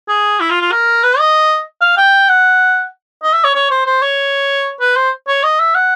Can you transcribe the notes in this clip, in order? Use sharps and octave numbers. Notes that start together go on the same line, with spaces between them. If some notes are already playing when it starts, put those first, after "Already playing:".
G#4
E4
F4
F4
A#4
B4
D#5
F5
G5
F#5
D#5
E5
C#5
C#5
C5
C5
C#5
B4
C5
C#5
D#5
E5
F#5